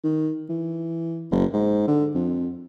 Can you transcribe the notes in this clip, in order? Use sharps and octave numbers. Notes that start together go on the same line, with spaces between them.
D#3
E3
F#1
G#2
D3
F2